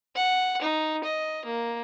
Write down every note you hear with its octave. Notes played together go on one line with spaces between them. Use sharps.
F#5
D#4
D#5
A#3